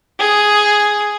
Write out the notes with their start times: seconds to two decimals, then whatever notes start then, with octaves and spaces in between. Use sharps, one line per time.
0.19 G#4 D#6